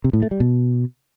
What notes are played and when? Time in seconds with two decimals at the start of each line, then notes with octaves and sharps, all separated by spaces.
0.04 C3
0.13 A2
0.22 A3
0.31 G3
0.40 B2